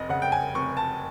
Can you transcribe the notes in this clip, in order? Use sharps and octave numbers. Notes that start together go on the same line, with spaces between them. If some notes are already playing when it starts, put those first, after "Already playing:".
Already playing: F1 D#5
C#3 F#5
G5
G#5
F1 C#6
A5